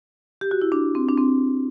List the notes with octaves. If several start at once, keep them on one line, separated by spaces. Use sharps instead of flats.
G4
F#4
E4
D4
C4
D4
C4